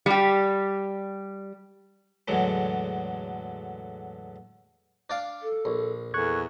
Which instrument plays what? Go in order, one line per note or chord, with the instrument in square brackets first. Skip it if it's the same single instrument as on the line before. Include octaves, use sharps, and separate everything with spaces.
[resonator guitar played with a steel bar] G3 G4
[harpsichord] E2 A2 D3 F#3 G#3
D4 D5 F5
[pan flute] A4
[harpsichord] A#1
[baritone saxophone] E2 [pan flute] A4 [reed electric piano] C#6 F#6 G#6